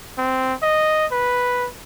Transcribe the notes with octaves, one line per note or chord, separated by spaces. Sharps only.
C4
D#5
B4